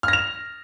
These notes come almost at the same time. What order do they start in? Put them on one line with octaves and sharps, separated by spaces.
F6 A#6 F7